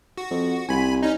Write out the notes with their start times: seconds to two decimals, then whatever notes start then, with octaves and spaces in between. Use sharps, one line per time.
0.18 F#4
0.31 F2
0.69 C2 G#5 B5
1.03 C#4 D#4